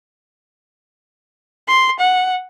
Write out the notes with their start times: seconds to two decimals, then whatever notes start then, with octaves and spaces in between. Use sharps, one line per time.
1.68 C6
2.00 F#5